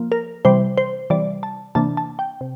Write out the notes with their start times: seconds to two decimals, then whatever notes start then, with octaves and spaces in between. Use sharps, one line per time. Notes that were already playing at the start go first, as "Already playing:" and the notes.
Already playing: F3 A#3
0.12 A#4
0.45 C3 E3 G3 C5
0.78 C5
1.10 C3 E3 G3 D5
1.43 A5
1.75 C3 E3 A#3 D4 A5
1.97 A5
2.19 G5
2.41 C3